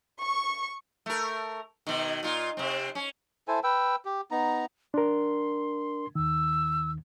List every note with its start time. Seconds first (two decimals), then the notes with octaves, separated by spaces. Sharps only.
0.19 C#6
1.06 A3 A#4
1.87 B2 D#3
2.23 A#2 D#4 F4
2.57 C3 C4
2.95 C#4
3.48 E4 A4 C5 G#5
3.63 B4 G5 E6
4.05 G4
4.31 B3 D#4 A#5
4.94 D4 A#4 C6
6.15 D#2 D#3 E6